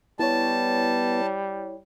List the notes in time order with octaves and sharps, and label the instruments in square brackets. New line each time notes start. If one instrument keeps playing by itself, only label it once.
[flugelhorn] G3 [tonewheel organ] B3 [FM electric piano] E4 C#5 [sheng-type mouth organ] A5